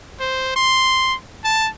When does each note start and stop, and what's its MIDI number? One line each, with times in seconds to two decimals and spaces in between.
0.20 0.54 72
0.56 1.15 84
1.44 1.69 81